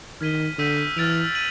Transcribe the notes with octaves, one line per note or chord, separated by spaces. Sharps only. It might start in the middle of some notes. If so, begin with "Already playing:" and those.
D#3 F6 G#6 B6 D#7 G7
D3 E6 G6 B6 D#7
E3 F6 A6 D7 F7
D#7 F#7